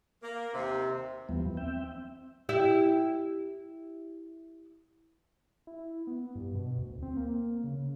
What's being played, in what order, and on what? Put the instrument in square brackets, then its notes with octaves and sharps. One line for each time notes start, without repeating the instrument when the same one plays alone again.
[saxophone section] A#3
D#2 C3
[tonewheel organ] D#2 E3 F3 G3 B3
C4 E5 G5
[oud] E4 G4 E5
[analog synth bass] E4
B3
G2
B2
D2
C4
A#3
C#3